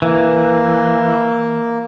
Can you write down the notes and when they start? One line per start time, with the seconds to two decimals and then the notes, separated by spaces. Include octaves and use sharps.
0.02 E3 A#3